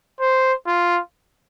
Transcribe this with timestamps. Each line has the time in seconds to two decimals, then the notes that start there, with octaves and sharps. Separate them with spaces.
0.20 C5
0.67 F4